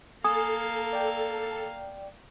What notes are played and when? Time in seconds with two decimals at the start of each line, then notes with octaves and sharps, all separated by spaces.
0.24 A#3 A4 F5 G#5 D#6
0.93 D5 G5